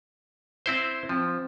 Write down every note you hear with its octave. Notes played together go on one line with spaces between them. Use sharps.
C4 E4 C5
F3 C4